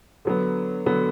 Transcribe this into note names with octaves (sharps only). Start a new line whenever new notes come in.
D3 F#3 B3
D3 F#3 B3